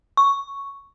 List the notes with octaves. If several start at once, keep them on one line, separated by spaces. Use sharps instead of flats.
C#6